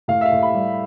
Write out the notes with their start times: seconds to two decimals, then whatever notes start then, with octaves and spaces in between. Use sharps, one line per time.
0.08 A2 F5
0.21 E5
0.25 F5
0.32 A2
0.43 B5
0.54 G3